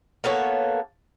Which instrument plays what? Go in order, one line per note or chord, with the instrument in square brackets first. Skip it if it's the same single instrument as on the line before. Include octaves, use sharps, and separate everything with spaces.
[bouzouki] A#3 B3 A4 C#5